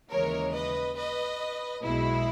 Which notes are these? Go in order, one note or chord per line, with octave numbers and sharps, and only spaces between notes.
D#2 C#3 E3 G#3 A#4 C#5
B4 D#5
B4 D#5
B1 B2 G#3 E4